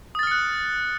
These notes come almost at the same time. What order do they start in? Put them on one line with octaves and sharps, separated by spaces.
D#6 A6 F6 C#7 F#6